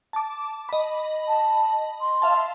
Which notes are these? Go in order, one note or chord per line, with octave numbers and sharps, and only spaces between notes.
A5 D6
D#5 B5
A5
C6
E5 F5 A5